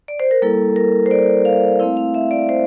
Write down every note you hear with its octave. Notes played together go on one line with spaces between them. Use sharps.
D5
C5
A#4
G3 A#3 E4 A4
A#4
C5
D5
F5
A3 C4 E4 F5
F5
E5
D5
C5